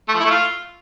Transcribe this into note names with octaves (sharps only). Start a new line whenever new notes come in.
A3
F3
E4
A3
F4